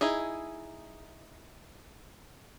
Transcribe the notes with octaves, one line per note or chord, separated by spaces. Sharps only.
D#4 E4 G#4